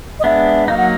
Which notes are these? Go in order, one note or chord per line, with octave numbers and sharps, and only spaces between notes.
D#5
G#3 B3 D4 E5
F#3 A#3 D#4 F5
F#5